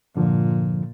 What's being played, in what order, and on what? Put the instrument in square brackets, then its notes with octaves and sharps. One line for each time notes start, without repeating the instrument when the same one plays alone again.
[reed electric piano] G2 D3 F3 [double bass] A#2